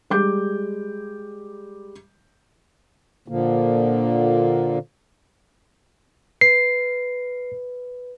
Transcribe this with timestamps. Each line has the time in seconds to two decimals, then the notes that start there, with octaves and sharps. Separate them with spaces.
0.10 G3 G#3 D6 G6
3.28 A#2 D3 F3 A#3
6.41 B4 C7